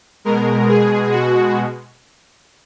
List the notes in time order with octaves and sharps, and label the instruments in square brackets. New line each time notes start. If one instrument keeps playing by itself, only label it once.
[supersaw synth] B2 G#3 A#4
G#4
F#4